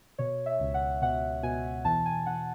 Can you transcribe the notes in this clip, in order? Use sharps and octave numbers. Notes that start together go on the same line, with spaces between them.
B2 C#5
E5
C#2
F#5
B2 F#5
B2 G#5
E2 A5
G#5
E2 F#5